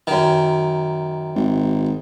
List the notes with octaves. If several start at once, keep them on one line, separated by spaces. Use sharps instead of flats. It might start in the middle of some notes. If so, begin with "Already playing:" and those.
F#2 D#3
G#1